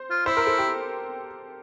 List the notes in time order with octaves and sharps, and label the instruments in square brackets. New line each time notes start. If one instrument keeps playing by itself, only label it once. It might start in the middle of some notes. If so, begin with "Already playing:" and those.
Already playing: [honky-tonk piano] C5
[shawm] F4
[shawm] E4 [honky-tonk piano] C5
[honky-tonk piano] A#4
A4
G4